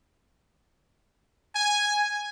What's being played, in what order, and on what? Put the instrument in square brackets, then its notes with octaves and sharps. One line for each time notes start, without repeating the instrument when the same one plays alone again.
[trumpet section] G#5